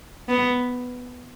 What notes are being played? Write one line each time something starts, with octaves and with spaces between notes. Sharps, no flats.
B3